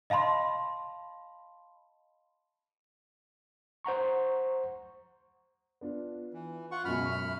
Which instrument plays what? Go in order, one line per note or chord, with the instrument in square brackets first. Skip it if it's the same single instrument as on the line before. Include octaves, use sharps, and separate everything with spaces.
[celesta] D#5 F5 A5 B5 C6
[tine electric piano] C5 F#5 A#5 C#6
[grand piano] B3 D4 F4
[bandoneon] E3
F4 F#5 C#6
[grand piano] C#2 B2 C#4 [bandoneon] F#2 B5 F6
[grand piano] E5 C#6